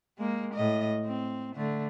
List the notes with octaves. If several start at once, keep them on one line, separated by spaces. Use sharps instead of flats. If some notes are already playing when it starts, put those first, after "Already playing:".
G#3 A#3
A2 D#5
C4
D3 A3